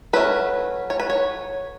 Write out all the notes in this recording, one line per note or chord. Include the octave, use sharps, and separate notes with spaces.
F#3 A3 C#4 B4
C#5
B4
C#5